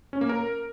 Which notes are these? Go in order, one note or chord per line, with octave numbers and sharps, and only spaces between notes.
C#4
A#3
A#4